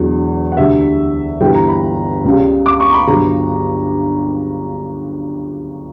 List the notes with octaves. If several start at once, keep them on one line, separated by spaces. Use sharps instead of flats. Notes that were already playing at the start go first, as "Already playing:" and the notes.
Already playing: E1 E2 D3 F#3
F#5
D2 D3 G3 E5
G1 G2 E3 G3 G5
A#5
B5
C#2 C#3 G3
D6
C#6
A#5
B5
G1 G2 F#3 A#5